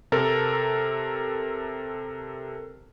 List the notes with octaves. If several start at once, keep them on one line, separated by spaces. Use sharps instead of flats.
C3 A4 A#4